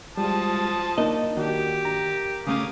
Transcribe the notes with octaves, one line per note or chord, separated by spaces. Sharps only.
F3 G3 G#3 A5 D#6
A#3 D4 D#4 D#5
D#3 D4 F#4 G4
A#5
C#3 A3 C#4 F5 D6 D#6